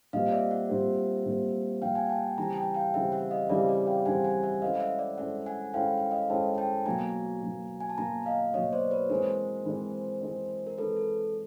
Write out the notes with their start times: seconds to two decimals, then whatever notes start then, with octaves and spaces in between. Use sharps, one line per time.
0.13 A#2 G3 C4 D#5 F5
0.32 D5 E5
0.51 E5 F#5
0.69 A#2 G3 C4
1.26 A#2 G3 C4
1.82 A#2 G3 C4 F5 G5
1.95 F#5 G#5
2.09 G5 A5
2.38 C#3 E3 G3 C4 G#5 A#5
2.56 G5 A5
2.75 F5 G5
2.94 C#3 E3 G3 C4 E5 F#5
3.12 E5 F#5
3.31 D#5 F5
3.49 C#3 E3 G3 C4 D5 E5
3.69 D5 E5
3.87 F5 G5
4.06 C#3 E3 G3 C4 F#5 G#5
4.24 F#5 G#5
4.43 E5 F#5
4.62 G#3 C#4 E4 A4 C5 D#5 F5
4.81 E5 F#5
4.99 D5 E5
5.18 G#3 C#4 E4 A4 C5 E5 F#5
5.46 F#5 G#5
5.74 G#3 C#4 E4 A4 C5 F5 G5
6.11 D#5 F5
6.29 G#3 C#4 E4 A4 C5 G5 A5
6.58 G5 A5
6.86 B2 F#3 A#3 G#5 A#5
7.42 B2 F#3 A#3
7.80 G#5
7.89 A5
7.97 B2 F#3 A#3 G#5 A#5
8.26 D#5 F5
8.53 B2 F#3 A#3 C#5 D#5
8.72 C5 D5
8.91 B4 C#5
9.09 E3 G#3 C4 A#4 C5
9.65 E3 G#3 C4
10.22 E3 G#3 C4
10.67 A#4
10.78 E3 G#3 C4 A4 B4
10.97 A4